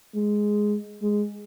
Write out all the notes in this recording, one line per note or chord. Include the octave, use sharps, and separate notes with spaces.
G#3
G#3